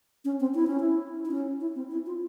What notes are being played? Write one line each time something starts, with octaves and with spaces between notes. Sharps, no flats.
C#4
C4
E4
C#4
E4
E4
C#4
E4
C4
E4
F4